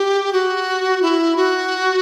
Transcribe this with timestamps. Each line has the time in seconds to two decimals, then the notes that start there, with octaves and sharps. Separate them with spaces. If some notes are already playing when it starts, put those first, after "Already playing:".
Already playing: G4
0.33 F#4
1.02 E4
1.37 F#4